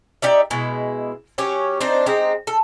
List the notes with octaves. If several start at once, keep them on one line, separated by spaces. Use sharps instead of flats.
D#4 G4 D5 E5
B2 G#3 E4
F#3 C#4 G4 C#5
C4 D4 D#4 C5
G#3 C4 D#4 G4
A4